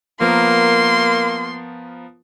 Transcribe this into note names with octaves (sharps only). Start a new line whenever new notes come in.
F3 A#3 B3 A#4 C6